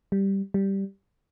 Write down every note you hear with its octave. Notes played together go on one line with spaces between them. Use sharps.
G3
G3